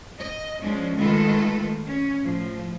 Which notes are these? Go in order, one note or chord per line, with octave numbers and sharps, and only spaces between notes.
D#5
F3 G#3 C#4 D4
D#3 G#3 A3 F4 A4 B4
C#4
A2 F3